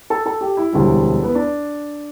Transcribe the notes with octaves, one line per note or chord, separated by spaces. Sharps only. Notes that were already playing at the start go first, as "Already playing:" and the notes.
A4
A4
G4
E4
E1 D2 D3 G3
B3
D4